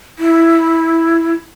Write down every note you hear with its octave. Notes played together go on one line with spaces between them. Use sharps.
E4